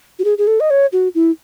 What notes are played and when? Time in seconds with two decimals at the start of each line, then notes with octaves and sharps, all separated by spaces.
0.19 F#4
0.24 G#4
0.38 G#4
0.47 A4
0.60 D#5
0.70 C#5
0.92 F#4
1.15 E4